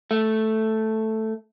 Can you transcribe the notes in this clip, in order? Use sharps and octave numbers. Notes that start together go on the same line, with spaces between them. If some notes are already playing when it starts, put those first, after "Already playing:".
A3